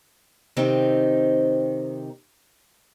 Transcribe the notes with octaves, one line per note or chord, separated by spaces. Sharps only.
C3 D#3 C4 D#4